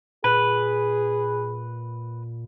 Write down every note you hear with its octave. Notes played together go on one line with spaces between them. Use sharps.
A#2 G#4 B4